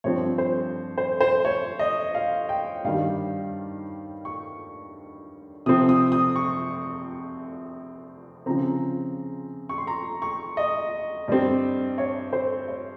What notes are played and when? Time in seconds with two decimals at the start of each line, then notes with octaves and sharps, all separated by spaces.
0.04 G2 F3 C4 C#5
0.38 C5
0.98 C5
1.21 C5
1.45 C#5
1.79 D#5
2.15 F5
2.49 G5
2.84 G2 D#3 G3 F5
4.25 C#6
5.66 C3 F3 C4 D#6
5.89 D#6
6.12 D#6
6.36 C#6
8.46 C#3 F3 C4 A#5
9.69 C#6
9.78 C6
9.87 A#5
10.22 C#6
10.57 D#5
11.28 G2 G3 C4
11.98 C#5
12.33 C5
12.68 C#5